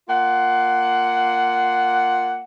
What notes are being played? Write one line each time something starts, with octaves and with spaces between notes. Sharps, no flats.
A#3 F4 F#5